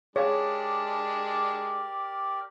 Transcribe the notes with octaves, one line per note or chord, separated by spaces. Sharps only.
G#3 D4 G4 G#4 A#4 C#5 D5 F5